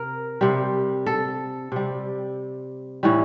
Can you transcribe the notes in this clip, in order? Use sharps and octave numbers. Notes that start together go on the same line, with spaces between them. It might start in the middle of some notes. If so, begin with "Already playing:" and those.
Already playing: C3 A#4
C3 G3
A4
C3 G3
A2 E3 G3